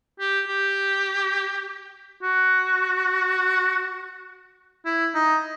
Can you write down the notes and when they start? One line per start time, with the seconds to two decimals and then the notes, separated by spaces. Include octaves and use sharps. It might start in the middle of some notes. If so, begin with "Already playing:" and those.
0.20 G4
0.48 G4
2.23 F#4
4.85 E4
5.14 D#4